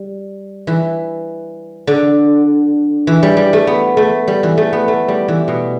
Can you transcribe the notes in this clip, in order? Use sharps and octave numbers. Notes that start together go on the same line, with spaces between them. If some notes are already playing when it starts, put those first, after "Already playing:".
Already playing: G3
E3
D3
E3
G3
G3
A3
B3
A3
G3
E3
A3
B3
A3
G3
E3
B2